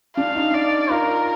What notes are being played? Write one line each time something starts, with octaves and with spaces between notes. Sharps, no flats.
D4 F5
D#4
D5
F4 A#4